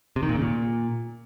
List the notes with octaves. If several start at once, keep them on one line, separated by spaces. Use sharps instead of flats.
C3
D#3
A#2
C#3
A#2